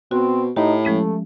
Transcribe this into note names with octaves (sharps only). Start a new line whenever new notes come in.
B2 C4 F#4
A2 D#4 G4
F3 G#3 A3 C#4